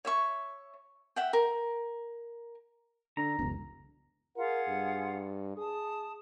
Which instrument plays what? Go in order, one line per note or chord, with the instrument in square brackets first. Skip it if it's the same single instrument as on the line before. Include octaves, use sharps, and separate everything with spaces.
[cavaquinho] C#5 E5 C#6
E5 F#5 G5
A#4
[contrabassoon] D3 [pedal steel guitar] A#5
[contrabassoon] E1 [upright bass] C#2 F#2
[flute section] F4 G#4 F#5 [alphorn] A#4
[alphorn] G2
[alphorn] G#4 [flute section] A5 D#6